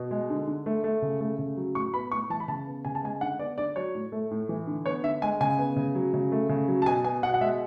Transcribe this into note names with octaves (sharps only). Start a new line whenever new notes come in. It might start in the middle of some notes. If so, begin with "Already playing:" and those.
Already playing: B2
G#3
D3
D3
A3
A3
C#3
A3
C#3
F#3
A2 C#6
B3 B5
A2 C#6
E3 A5
B5
C#3 A5
B3
C#3 G#5
A5
G#3 G#5
D3 F#5
B3 D5
D3 D5
F#3 C#5
A2
A3
A2
E3
D3
B3 C#5
D3 E5
G#3 G#5
C#3 G#5
B3
C#3
F#3
C#3
A3
C#3
F#3
A5
B2 G#5
B3 G#5
B2 F#5
F#5
G#3 E5